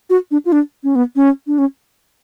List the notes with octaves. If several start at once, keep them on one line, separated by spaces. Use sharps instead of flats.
F#4
D4
F4
D4
C#4
B3
C#4
D4
C#4